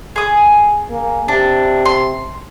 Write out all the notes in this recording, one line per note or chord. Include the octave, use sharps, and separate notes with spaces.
G#4 D#6
A#3
C3 D4
C6